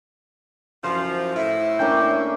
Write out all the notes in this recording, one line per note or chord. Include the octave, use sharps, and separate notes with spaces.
F#2 E3 F3 C5
A2 E4
A#3 C#4 D4 G5